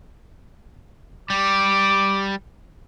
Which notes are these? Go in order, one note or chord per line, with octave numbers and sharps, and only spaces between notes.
G3 D6